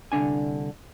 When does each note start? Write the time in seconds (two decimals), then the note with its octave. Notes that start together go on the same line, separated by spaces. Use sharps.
0.12 C2 D3 D4 G#5